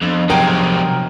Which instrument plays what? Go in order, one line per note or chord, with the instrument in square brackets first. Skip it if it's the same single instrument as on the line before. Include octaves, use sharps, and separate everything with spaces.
[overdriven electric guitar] F2 [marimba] F3 B3 D4
[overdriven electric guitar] C3 G#3 [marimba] F3 A5 F6 [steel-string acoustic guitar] F#3 [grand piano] A#4 G5